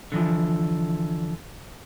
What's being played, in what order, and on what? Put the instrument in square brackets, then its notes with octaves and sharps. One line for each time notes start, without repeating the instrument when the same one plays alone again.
[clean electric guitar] D3 E3 F3